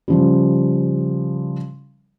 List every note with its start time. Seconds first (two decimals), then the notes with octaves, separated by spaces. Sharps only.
0.08 C#3 F3 G3